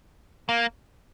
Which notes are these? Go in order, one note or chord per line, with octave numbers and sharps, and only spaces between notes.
A#3